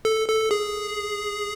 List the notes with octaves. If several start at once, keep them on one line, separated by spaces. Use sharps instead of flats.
A4
A4
G#4